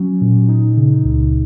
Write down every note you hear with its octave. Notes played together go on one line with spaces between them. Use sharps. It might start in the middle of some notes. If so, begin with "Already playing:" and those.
Already playing: F#3 C#4
A#2
D#4
C#3
C#2